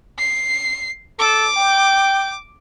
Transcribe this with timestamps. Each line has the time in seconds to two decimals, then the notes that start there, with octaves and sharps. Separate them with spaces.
0.18 C7
1.19 A4 D6
1.57 G5